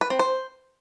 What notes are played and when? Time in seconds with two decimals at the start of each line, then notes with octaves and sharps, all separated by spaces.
0.01 B4
0.10 C4
0.19 C5